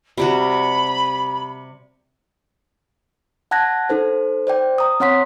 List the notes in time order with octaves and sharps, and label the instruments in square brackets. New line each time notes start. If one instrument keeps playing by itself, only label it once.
[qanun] C3 G3 F#4 [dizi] B5
[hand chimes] F#5 A5 F#6 G#6 A#6
D#4 A4 C5
C5 D5 G5
A#5 D#6
C4 C#5 F#5 C6 B6